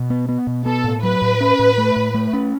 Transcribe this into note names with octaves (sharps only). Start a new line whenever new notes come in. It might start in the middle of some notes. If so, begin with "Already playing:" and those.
Already playing: B2
B3
B3
B2
B3 A4
A2
F#3 B4
A2
C#4
A2
A3
A2
A3
C#4